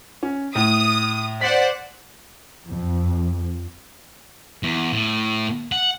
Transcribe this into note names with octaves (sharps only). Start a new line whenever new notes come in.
C#4
A2 D#6
C5 D5 F#5 B6
F2
E2
A2
F#5